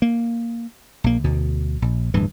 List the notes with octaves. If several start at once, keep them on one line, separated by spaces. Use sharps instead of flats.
A#3
A#1 A#3
D2 B2
A#1
D1 G2 E3